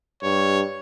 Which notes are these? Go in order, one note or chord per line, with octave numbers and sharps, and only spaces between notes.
G2 C#5